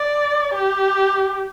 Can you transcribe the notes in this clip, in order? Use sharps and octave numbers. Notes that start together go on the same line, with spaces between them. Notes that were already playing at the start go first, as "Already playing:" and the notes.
Already playing: D5
G4